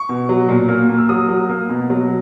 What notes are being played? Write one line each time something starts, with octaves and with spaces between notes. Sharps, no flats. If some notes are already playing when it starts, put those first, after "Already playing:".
Already playing: C#6
B2
F#3
A#2
A#3
A#3
E6
F#3 D#6
F#3
A#3
B2
F#3